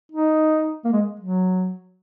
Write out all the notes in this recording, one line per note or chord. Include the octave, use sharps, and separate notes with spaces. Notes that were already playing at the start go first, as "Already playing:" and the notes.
D#4
A#3
G#3
F#3